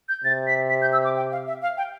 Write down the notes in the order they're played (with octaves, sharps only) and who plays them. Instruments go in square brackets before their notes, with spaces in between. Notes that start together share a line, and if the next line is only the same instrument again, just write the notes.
[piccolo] G6
[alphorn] C3 [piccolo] A6
[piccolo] B6
B6
G6
E6
D6
G5
F5
E5
F5
G5